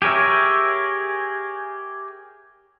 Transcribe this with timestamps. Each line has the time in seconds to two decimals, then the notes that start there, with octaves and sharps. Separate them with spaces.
0.02 G4 G#4 A#4 C#5 E5